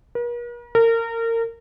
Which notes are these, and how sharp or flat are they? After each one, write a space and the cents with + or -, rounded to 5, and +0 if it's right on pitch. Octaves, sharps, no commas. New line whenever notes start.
A#4 +45
A#4 -30